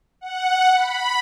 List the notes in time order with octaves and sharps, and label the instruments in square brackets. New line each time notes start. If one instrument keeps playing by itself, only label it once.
[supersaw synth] F#5
B5